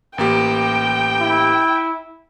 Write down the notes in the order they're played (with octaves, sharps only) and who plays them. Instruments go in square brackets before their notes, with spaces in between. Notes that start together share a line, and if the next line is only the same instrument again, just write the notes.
[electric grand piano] A1 A#3 G4 [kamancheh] G5
[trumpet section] E4